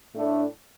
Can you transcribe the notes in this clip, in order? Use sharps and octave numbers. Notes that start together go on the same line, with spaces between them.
A2 A3 D4